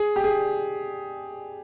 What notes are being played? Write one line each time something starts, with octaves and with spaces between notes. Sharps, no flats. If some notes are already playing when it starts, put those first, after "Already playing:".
Already playing: G#4
G4
G#4